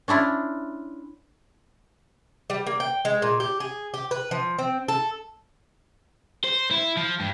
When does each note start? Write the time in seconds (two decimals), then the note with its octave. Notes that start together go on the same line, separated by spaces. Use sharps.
0.08 C#4 D4 E4 F4
2.50 G3
2.66 A#3
2.80 G5
3.05 G#3
3.22 A#2
3.40 G4
3.60 G#4
3.94 G4
4.11 B4
4.31 F3
4.59 C4
4.88 A4
6.44 C5
6.71 E4
6.97 F3
7.20 G2